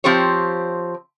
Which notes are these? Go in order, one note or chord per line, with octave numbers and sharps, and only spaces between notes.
F3 C4 G4 C5 C#5